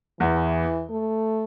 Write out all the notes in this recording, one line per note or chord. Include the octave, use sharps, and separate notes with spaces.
E2 E3
A3